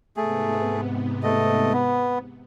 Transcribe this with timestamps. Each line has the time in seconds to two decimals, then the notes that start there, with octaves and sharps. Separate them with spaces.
0.17 G#2 C3 A3 B3 G#4
1.23 A3 D#5
1.73 B3